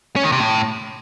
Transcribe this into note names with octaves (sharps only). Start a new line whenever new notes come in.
C#4
D#3
C3
A2